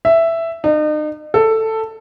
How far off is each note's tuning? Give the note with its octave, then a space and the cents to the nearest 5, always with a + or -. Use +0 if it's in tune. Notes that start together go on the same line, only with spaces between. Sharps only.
E5 +5
D#4 -40
A4 +10